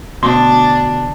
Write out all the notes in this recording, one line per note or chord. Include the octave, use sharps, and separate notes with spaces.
D2 B2 D4 C6